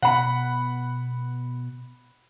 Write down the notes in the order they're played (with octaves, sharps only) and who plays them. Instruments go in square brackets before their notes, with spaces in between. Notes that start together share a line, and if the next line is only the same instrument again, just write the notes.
[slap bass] B2 B3 [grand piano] F#5 B5